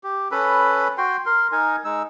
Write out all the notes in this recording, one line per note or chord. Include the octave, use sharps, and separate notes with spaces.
G4
C#4 A4 B4 B5
F#4 G5 C6
A#4 C6
D#4 A#4 G#5
G#3 D#4 E6